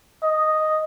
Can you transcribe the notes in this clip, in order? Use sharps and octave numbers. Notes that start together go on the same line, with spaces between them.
D#5